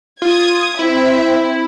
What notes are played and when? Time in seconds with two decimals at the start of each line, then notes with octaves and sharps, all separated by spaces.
0.22 F4 D#6 G#6
0.79 C4 E4 E5